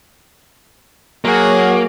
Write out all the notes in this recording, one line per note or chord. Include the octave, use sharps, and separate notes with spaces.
F#3 A#3 F#4 G#4